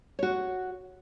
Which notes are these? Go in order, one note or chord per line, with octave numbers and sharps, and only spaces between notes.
F#4 C#5